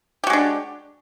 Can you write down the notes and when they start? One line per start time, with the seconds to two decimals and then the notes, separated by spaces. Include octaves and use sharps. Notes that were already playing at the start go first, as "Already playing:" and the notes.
0.24 G4
0.27 F#4
0.30 G#3
0.33 D4